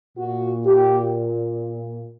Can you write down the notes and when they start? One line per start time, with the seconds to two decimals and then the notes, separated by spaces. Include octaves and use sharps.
0.17 A#2 F#4
0.65 G4